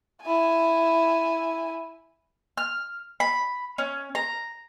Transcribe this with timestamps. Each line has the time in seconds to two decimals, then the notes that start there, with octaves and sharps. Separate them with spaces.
0.23 E4 G#5
2.57 F6
3.20 B5
3.78 C#4
4.15 A#5